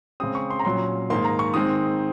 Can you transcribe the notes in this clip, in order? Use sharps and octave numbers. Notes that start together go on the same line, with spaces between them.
C#3 G#3 C4 D#6
C#6
C6
A#5
A#2 F#3 C#4 C6
G#2 D#3 A#3 C6
A#5
C#6
D#3 G#3 C4 D#6